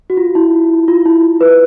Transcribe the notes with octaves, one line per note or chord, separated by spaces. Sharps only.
F#4
F4
E4
F4
E4
F4
B4